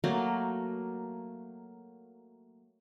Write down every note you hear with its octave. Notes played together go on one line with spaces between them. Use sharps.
F#3 A3 A#3